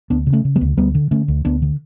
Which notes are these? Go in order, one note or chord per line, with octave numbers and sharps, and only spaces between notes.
D2 B3 D4
C#3
A3 C#4
C#3
G3 B3
D2
D2 G3 B3
D3
D3 A3 C#4
D2
D2 B3 D4
D3